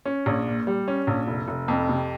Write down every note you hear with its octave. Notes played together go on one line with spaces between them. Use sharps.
C#4
A#1
A#2
G3
C#4
A#1
F1
F1
F2
C3